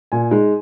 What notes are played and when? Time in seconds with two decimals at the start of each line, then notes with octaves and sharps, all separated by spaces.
0.12 A#2 G#5
0.31 G#3 D#4